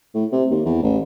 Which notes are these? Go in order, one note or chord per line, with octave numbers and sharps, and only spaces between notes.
A2
C3
D#2
E2
A1